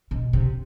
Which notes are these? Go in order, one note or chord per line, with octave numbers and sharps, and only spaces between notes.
B2
C3